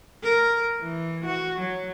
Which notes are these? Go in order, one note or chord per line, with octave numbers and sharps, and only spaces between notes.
A#4
E3
F#4
F#3